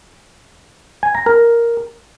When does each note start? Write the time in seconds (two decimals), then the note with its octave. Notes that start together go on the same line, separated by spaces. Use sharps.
1.03 G#5
1.15 A#5
1.26 A#4